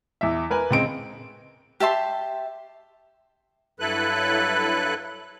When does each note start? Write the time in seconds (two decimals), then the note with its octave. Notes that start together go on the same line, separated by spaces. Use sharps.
0.21 E2 E4 E5
0.51 A#4 B4 G#5
0.71 C#2 G#3 C4 D#5 D7
1.80 G4 E5 A5 C6
3.80 G2 F#3 E4 A4 B4 F#6